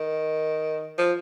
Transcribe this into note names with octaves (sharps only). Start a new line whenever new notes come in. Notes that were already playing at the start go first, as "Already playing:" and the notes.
Already playing: D#3
F3